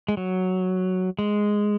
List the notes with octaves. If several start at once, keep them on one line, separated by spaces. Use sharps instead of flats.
G#3
F#3
G#3